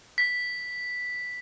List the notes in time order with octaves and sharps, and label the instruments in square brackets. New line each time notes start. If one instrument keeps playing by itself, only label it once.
[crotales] B6